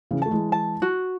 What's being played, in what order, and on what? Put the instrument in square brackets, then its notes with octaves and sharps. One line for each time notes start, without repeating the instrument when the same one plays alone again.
[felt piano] C#3 E3
[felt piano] A3 [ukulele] A5
[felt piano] E3 G#3
[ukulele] A5
F#4